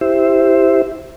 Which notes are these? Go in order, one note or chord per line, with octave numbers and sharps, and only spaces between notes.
E4 G4 C5 E5